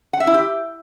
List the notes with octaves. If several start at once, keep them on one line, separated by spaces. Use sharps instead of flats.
F#5
E5
E4
G4